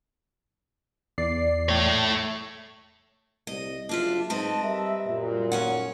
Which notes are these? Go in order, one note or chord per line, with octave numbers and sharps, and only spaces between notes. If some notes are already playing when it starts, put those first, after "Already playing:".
E2 D5 C7
A3 C#5
C2 D#5
F#1 D4 F4 E5
G#2 C4 B4 D#5 A5
G3 A#4 E5
F#2 A#2
D#1 C#4 C#5 F#5